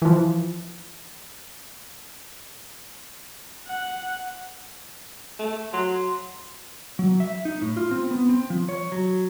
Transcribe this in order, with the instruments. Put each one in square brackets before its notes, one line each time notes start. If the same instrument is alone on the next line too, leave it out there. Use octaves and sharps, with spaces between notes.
[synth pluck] E3 F3
[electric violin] F#5
[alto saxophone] A3
[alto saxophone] F#3 [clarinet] C6
[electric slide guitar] F#3
E5
D#4
A2
F4
C4
B3
C4
F3
C#5
F#3